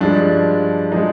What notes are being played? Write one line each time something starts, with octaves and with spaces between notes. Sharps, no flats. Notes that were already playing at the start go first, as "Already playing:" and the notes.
G2 F3 G#3 D4
F3 G#3 D#4